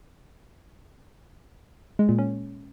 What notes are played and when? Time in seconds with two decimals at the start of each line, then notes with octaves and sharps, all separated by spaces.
1.99 G#3
2.09 A#2
2.18 C#4